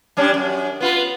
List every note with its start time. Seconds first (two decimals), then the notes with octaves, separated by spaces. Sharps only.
0.17 G3 C#4 D4
0.34 F#2
0.81 B3 F4 B4